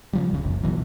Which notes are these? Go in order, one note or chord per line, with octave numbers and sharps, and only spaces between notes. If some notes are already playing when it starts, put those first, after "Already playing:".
C#3 F3 G3
D1 C#3
F1 B1 F#2
B1 B2 E3 F#3